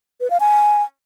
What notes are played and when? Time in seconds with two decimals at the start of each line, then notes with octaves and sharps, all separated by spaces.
0.21 B4
0.30 F5
0.40 G#5